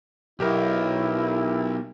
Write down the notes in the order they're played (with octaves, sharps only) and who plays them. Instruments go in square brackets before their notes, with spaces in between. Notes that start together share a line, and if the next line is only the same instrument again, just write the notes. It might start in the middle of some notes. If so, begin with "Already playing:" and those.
[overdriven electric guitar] B1 [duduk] E4 [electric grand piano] G4 A#4